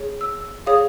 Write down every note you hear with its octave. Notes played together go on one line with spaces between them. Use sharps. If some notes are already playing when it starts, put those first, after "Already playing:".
Already playing: G#4 C#5
E6
G#4 C#5 F5 D#6